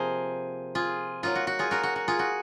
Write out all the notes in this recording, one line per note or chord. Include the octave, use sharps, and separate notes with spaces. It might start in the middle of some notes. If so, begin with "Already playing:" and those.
Already playing: C3 F3 A#3 G#4 A#4 C5
F4 G#4
F#3 A#3 D#4 F4
F#4
F#4
F4 G#4
F#4 A#4
F#4
F#4
F4 G#4
F#4